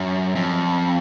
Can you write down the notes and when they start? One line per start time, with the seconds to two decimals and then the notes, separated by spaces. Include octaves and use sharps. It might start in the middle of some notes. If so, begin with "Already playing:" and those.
Already playing: F#2
0.35 F2